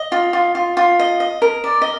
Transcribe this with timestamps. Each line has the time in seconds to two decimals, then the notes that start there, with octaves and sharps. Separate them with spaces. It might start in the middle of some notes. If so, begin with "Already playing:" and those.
Already playing: D#5
0.12 F4
0.33 F4
0.55 F4
0.77 F4
0.99 D#5
1.20 D#5
1.42 A#4
1.64 D5
1.82 D#5